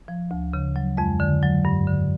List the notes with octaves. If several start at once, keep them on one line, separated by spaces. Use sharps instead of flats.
F3
D2
C#3
F#3
F2 G#3
D3
F#3
G2
D3